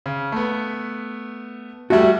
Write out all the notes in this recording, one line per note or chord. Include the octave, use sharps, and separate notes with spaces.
C#3
A3 B3
G3 A3 F#4 E5